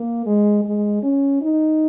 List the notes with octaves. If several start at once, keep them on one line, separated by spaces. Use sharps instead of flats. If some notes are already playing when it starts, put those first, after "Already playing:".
Already playing: A#3
G#3
G#3
C#4
D#4